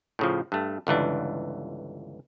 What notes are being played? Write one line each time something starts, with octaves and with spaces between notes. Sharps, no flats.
A2 C#3 F3
G2 A3
G1 C#2 E3 D4